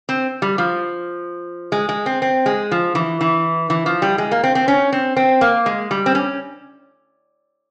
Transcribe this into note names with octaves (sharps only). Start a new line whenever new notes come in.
C4
G3
F3
G#3
G#3
C4
C4
G#3
F3
E3
E3
E3
F3
G3
G#3
A#3
C4
C4
C#4
C4
C4
A#3
G#3
G3
C4
C#4